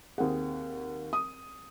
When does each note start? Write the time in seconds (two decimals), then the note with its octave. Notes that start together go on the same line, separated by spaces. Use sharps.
0.18 D#2 C4 G#4 F#5
1.13 D#6